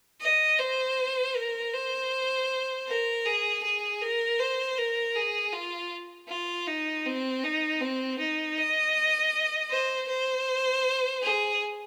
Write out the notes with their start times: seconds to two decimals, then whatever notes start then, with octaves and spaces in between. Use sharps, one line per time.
0.21 D#5
0.59 C5
1.36 A#4
1.74 C5
2.88 A#4
3.25 G#4
3.63 G#4
4.01 A#4
4.39 C5
4.78 A#4
5.15 G#4
5.53 F4
6.29 F4
6.67 D#4
7.06 C4
7.43 D#4
7.81 C4
8.19 D#4
8.57 D#5
9.71 C5
10.09 C5
11.23 G#4